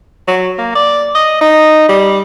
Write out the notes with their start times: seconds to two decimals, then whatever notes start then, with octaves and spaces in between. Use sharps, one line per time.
0.27 F#3
0.58 A#3
0.75 D5
1.15 D#5
1.41 D#4
1.89 G3